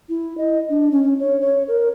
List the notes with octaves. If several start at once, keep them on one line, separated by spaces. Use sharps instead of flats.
E4
D#5
D4
C#4
C#4
C#5
C#5
A#4